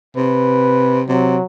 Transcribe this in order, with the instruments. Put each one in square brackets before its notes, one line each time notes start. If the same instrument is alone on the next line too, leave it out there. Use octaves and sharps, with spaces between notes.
[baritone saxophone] C3 [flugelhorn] B4
[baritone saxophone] C3 [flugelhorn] F#3